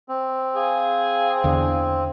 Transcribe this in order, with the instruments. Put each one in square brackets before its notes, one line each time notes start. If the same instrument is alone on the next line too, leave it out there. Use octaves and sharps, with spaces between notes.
[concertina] C4
[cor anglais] G#4 [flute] F5
[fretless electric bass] E2 D3